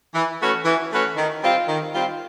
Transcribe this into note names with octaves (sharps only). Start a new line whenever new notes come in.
E3
A3 C#4 F#4 B4
E3
A3 C#4 F#4 B4
D#3
G3 C4 F4
D#3
G3 C4 F4